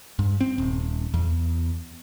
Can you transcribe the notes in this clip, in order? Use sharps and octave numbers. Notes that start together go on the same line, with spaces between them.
G2
C4
D#1
E2